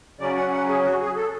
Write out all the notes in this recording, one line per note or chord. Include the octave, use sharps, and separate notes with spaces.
C#3 F#3 C#4 D5
F#5
F#5
G#4
F#4
G#4
A4